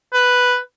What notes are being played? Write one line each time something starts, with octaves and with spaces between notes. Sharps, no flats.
B4